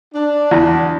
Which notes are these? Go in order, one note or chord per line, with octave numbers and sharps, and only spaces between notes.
D4
E2